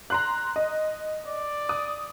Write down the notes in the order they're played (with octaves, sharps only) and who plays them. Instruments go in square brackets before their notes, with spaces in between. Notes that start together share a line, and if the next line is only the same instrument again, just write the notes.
[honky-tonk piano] A#5 C6 F#6
D#5
[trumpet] D5
[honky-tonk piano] D#6